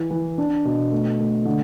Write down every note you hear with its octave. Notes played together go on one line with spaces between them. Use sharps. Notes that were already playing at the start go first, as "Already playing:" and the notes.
Already playing: E3
E3
D4
B2
A3
A3
D3